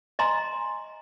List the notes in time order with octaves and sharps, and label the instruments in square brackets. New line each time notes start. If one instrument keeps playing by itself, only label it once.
[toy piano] D#5 G#5 A#5 C6